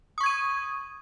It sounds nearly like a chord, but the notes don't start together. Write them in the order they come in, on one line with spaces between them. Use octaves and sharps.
D#6 C#6 G#6 D#7